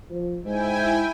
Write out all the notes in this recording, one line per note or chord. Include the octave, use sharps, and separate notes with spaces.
F3
G#2 E4 G5 G#5